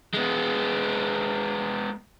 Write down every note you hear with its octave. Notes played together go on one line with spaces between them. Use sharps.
G#3 B3